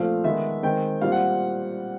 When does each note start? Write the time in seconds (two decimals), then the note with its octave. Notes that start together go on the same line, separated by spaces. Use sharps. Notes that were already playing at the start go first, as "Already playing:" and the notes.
Already playing: A#2 F3 A3 C4 F5
0.24 D#3 G#3 B3 E5
0.63 D#3 G#3 C4 G5
1.02 A#2 G3 C4 F5
1.12 F#5